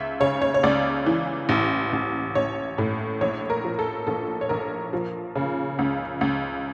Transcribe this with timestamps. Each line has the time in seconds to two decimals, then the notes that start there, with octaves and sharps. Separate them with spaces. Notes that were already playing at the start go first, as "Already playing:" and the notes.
Already playing: C#2 E5
0.20 C#3 C#5
0.42 C#5
0.54 C#5
0.63 C#2 D5
1.06 E3
1.49 A1
1.93 A1
2.35 A1 C#5
2.78 A2
3.21 A#1 C#5
3.50 A#4
3.64 F3
3.79 A4
4.07 A#1 A4
4.41 C#5
4.49 A#1 A#4
4.93 F3
5.36 C#3
5.79 C#2
6.21 C#2